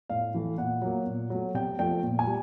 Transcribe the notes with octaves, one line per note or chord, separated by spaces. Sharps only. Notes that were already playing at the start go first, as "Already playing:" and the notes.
A2 F5
E3 A3
A#2 F#5
F#3 A#3
A#2
F#3 A3
C3 G5
F3 A3 G5
A#2
G#5
G3